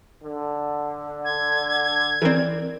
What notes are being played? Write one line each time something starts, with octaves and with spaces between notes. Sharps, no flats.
D3
G#6
E3 C4 A#4 D5